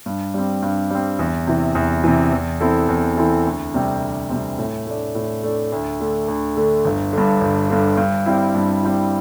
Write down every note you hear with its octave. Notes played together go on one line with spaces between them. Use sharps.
G2
G3 C4
G2
G3 C4
E2
C3 E3
E2
C3 E3
E2
E3 C4 E4 A4
E2
E3 C4 E4 A4
D2
C3 G3 C4
D2
C3 G3 C4
A2
A3 D4
A2
A3 D4
D2
D3 A3
D2
D3 A3
G1
G2 D3
G1
G2 D3
G2
G3 C4 E4
G2
G3 C4 E4